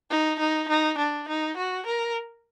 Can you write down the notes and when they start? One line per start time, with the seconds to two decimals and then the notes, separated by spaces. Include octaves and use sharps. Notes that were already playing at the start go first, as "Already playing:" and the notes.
0.11 D#4
0.40 D#4
0.69 D#4
0.98 D4
1.28 D#4
1.57 F#4
1.86 A#4